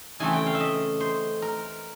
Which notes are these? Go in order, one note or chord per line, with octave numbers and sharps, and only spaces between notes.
C#3 E3 A3 C4 G#5
G5
F5
E5
D#5
C5
A#4